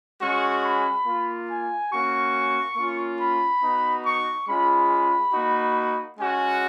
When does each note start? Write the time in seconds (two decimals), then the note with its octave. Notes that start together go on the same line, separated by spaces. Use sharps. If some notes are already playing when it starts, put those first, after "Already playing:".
0.21 G#3 C#4 F#4 C#6
0.64 B5
1.05 A#3 F4
1.49 G#5
1.91 A#3 C#4 F#4 C#6
2.76 A#3 C#4 F4
3.19 B5
3.62 B3 D#4 F#4
4.04 C#6
4.47 G#3 C#4 F4 B5
5.32 A#3 D#4 F#4
6.18 G#3 C#4 F#4 G#5